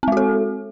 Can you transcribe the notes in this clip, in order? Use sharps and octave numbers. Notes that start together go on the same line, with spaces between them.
G#3 C4 F#4 A4